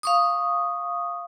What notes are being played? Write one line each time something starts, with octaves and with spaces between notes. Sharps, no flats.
F5 C#6 D#6